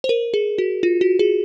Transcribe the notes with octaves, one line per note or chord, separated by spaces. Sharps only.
C5
A#4
G#4
F#4
F4
F#4
G#4